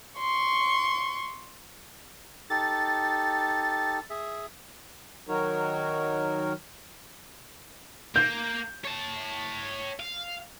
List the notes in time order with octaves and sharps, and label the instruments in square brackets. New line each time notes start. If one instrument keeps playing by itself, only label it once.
[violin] C6 C#6
[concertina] D#4 G4 A4 [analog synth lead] A6
[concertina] G#4 E5
[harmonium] D#3 F#3 D#4 F#4 A#4 C#5
[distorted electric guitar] A#3 [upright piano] G6
[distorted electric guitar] C#5 A5
F5